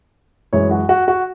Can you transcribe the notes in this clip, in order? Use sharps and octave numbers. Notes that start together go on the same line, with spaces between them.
F#2 E3 G#3 C#5
F#4
F#4
F#4